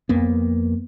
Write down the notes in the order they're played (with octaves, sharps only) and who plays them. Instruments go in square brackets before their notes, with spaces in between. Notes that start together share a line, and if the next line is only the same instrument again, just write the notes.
[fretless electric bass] F2 A#3 B3